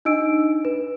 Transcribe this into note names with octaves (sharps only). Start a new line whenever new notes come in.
D4 D#4 D#5 E6 D7
B4